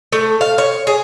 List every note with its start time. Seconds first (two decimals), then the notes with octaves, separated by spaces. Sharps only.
0.12 A3
0.41 F5
0.58 C#5
0.87 G#4